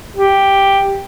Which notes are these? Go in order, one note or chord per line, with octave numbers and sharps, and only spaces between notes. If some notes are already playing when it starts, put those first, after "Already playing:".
G4